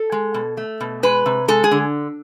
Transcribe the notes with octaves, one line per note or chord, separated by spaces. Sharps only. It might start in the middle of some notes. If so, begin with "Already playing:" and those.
Already playing: A4
G#3
B2
A3
B2
G#3 B4
C3
G#3 A4
G#4
D3